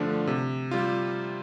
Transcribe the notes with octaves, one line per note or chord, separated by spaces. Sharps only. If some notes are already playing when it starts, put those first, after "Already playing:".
Already playing: G2 D3 F3 A3 D4
C3
G3 F4